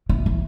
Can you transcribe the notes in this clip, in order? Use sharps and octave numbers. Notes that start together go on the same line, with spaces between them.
E3
E3